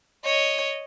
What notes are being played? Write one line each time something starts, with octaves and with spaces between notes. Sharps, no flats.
C#5 D#5